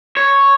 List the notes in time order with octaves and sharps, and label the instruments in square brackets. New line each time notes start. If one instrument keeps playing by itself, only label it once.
[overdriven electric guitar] C#5